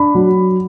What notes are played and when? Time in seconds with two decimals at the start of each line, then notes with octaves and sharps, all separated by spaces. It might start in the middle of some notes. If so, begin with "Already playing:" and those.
Already playing: D4 B5
0.15 F#3